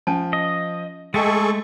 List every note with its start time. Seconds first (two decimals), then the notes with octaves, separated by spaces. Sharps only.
0.07 F3 C#4 G#5 A5
0.33 D#5
1.14 G#3 A3 G#4 A4 D#5 G5 C#6 A6